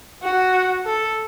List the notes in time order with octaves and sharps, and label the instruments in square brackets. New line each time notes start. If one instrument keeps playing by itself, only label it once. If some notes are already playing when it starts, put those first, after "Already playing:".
[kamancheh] F#4
A4